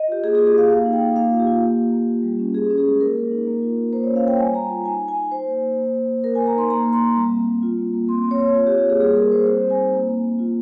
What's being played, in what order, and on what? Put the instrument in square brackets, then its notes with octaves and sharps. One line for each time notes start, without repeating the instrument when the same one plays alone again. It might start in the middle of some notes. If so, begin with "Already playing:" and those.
Already playing: [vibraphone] D#5
F4 G4
A#3 G#4
F4 G#4
G4
A#3 F5
A#3 F5
D#4
G5
D#4
A#3 F5
F4
G4
F4
A#3
F4
A#3
F4
G3
C#4
C#4 G#4
C#4
G#4
G#3
A#3 A#4
A#3
D#4
A#3
F4
F4
A#3 C5
C#4 C#5
F5
F4 G5
G3 G#5
G3 A#5
F4
D#4 G#5
D#4
G#5
D#4
D#4 C5
A#3
A#3
A#3
A#3
A#3
A#3 A#4
A#3 G#5
A#5
D#4 C6
A#3 A#5
A#3
C6
A#3
G3
C4
G3
F4
A#3
A#3
C4 C6
C4
C#5
C4
F4 C#5
G4
F4
G4
A#3 G#4
G3 G#4
G3 A#4
G3 C5
C4 C5
C4
G#5
D#4
A#3
A#3
A#3
F4